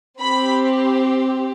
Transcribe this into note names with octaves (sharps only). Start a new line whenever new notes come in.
C4 G4 B5